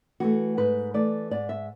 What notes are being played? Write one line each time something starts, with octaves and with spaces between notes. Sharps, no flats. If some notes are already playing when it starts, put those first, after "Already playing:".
E3 A3 F#4
G#2 B4
E3 A3 D5
G#2 D5
E5